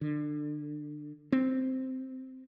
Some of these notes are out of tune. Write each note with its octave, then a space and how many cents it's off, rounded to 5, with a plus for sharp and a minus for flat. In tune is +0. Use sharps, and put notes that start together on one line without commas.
D3 +25
C4 -5